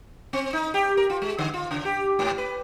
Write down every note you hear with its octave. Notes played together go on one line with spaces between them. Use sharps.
C4
D#4
G4
A#4
F4
G#3
D3
F4
C#3
G4
G#2
B4